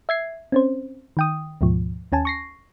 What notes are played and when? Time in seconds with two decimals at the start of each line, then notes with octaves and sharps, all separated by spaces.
0.09 E5 G#6 C7
0.52 C4 C#4 C5
1.17 D#3 G5 D#6
1.61 D2 G#2 B2 F3
2.12 D#2 C#4 G#5 A5
2.25 C#6 A#6 C7